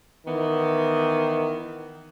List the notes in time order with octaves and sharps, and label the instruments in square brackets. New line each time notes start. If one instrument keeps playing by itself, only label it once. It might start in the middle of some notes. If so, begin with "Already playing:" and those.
[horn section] D#3 E3 B3